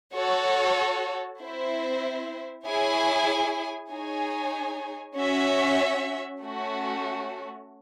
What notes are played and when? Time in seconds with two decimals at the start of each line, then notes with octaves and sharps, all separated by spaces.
0.14 F#4 A4 C#5
1.40 C4 E4 C5 E5
2.65 E4 G#4 C#5 G#5
3.91 D#4 G#4 C#5 G#5
5.17 C#4 F#4 C#5 E5
6.43 A3 C#4 F#4